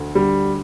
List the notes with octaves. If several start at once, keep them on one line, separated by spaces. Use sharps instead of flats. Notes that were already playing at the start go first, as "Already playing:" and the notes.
Already playing: D2 A3
D3 G3